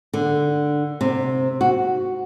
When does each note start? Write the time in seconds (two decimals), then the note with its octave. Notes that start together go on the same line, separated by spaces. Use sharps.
0.14 D3
1.01 C3
1.61 F#4